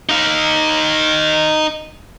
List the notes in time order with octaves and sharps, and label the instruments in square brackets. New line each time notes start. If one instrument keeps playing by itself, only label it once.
[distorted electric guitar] D#4 F5